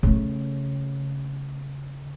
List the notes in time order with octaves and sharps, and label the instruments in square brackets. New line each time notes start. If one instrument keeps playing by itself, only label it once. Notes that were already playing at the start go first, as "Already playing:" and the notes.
[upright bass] C#3 A3